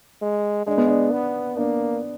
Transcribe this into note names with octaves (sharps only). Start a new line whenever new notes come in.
G#3
G#3 D4
B3
D4
B3
A#3 D4